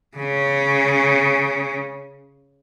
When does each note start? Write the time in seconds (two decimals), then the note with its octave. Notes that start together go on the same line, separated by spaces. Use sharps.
0.17 C#3 C#4